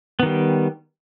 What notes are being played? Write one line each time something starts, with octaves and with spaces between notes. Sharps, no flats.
D#3 G3 B3